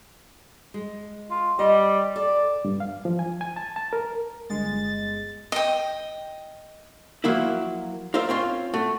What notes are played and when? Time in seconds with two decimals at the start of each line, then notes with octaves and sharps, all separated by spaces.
0.74 G#3
1.31 F4
1.59 G3 D#5
2.16 A4 D5
2.65 G2
2.80 F5
3.05 F3
3.19 G#5
3.41 G#5
3.56 A5
3.76 A5
3.93 A#4
4.50 G1 G#3 A6
5.52 D#5 G5
7.24 F3 F#3 A#3 E4
8.14 F4 A#4 C5 D5 E5
8.29 C4 C#4 F4
8.74 A3 F#4